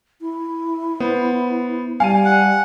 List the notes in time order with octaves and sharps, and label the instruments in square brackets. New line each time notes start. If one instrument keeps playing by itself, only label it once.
[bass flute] E4
[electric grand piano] B3 C5
[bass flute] G3 [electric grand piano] F5 A5 D#7 [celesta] G#5
[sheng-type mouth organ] F#5